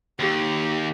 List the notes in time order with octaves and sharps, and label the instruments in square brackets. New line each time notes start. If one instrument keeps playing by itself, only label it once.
[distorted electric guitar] D#2 [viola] G4